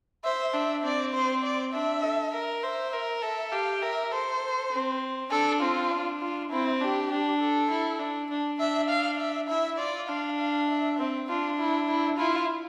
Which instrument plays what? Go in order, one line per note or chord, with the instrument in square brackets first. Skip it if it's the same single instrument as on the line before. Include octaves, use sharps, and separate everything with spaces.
[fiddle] C5 [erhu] E5
[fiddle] D4 [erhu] E5
[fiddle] C4 [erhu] D5
[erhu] C5
D5
[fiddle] D4 [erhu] E5
[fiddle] A4
A#4
[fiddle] C5 [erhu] E5
[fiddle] A#4
[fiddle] A4 [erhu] E5
[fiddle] G4 [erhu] F5
[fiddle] A#4 [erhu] E5
[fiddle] A4 [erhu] C5
[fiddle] C4
[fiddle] D4 [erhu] A4
[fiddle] C4 [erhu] F4
[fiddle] D4
[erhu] F4
[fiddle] C4 [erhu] E4
[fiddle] D4 [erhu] G4
[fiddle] D4
[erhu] A4
[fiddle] E4
D4
D4
[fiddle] D4 [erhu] E5
[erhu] F5
E5
[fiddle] E4 [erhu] E5
[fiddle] F4 [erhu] D5
[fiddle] D4 [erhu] F5
[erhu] F5
E5
[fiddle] C4
[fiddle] D4 [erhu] F4
[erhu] E4
E4
[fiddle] E4 [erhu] F4